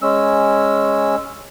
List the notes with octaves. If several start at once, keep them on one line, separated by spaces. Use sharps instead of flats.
G#3 C#4 E6